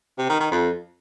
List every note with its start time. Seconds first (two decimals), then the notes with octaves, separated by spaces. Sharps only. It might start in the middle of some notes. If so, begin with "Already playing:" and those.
0.18 C3
0.29 D#3
0.40 D#3
0.51 F2